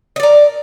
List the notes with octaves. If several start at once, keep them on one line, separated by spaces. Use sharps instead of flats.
A#4 D5 D#5